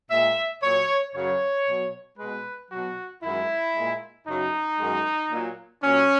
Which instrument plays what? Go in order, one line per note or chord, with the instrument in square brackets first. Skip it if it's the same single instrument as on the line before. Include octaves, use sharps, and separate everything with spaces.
[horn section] A#2 G#3 E5
A#2 F#3 C#5
F#2 C#3 F#3 C#5
B2 F#3
B2 G#3 B4
B2 F#3 F#4
F#2 D#3 G#3 E4
A#2 G#3
F#2 C#3 F#3 D#4
F#2 D#3 G#3
A#2 F#3
A#2 F#3 C#4